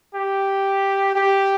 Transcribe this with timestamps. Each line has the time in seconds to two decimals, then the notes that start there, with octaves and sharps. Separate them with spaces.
0.15 G4
1.15 G4